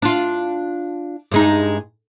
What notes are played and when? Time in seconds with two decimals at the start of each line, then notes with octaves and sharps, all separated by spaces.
0.02 D4 F4
1.32 G2 G#3 D#4